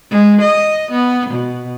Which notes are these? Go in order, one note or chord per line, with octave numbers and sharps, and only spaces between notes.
G#3
D#5
B3
B2